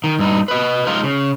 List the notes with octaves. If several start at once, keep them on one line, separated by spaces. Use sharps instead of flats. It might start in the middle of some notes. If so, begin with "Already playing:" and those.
D#3
G2 D#4
B4 D#5
F3 G#3 D#4 F4
C#3